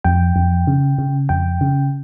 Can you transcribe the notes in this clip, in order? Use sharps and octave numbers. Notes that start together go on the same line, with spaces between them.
F2 G5
F2
C#3
C#3
F2 G5
C#3